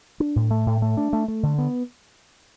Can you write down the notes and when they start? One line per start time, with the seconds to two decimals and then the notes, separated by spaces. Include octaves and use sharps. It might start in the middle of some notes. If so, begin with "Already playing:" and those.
0.20 D4
0.36 A2
0.51 A3
0.66 A2
0.82 A3
0.97 D4
1.13 A3
1.28 A3
1.43 D3
1.58 B3